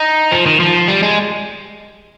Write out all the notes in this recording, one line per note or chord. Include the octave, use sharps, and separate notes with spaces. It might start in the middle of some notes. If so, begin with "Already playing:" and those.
Already playing: D#4
F3
D#3
F3
G3
G#3